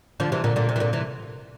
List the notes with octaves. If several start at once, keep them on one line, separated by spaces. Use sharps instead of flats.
D3 F3
C3 E3
A#2 D3
A#2 D3
C3
E3
A#2 D3
C3 E3